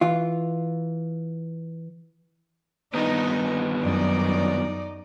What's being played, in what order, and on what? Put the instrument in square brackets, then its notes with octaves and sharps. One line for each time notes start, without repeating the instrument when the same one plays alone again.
[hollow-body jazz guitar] E3 F4
[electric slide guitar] G2 D#3 B3 [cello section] D#4
[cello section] F#2 D#4 D5